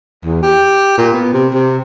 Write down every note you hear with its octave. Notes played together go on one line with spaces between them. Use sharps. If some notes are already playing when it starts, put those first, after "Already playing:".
E2
G4
A#2
B3
C3
C3